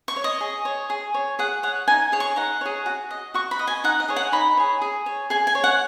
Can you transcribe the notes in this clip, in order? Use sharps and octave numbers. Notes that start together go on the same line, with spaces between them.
C#6
C#5
D#5
G#4
C#5
G#4
C#5
G#4 F#5
C#5 F#5
D#4 G#5
G#4 C#5
C#6
D#4 F#5
G#4 C#5
F#4
D#5
F#4 C#6
B5
D#5
G#5
D#4 F#5
D#5
G#4 C#5
F#5
D#4 B5
G#4 C#5
G#4
C#5
G#4 G#5
G#5
C#5
F#5